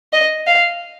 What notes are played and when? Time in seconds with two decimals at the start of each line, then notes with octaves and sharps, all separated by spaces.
0.13 D#5
0.47 F5